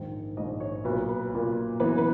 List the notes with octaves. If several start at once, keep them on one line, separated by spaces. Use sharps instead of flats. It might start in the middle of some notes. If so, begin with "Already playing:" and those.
Already playing: A#1 G#2 D#3
A#1 G#2 D#3 D#5
C#5
B1 A#2 A#3 B4
B4
B1 A#2 A#3
F#2 E3 B3 B4
B4